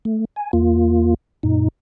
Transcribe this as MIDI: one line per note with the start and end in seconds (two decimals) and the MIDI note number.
0.05 0.25 57
0.36 0.51 80
0.53 1.14 40
0.53 1.14 58
0.53 1.14 65
1.43 1.68 42
1.43 1.68 46
1.43 1.68 63